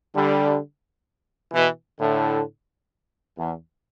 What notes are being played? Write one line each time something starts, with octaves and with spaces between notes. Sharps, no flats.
D3 G3
B2 E3
A2 D3
E2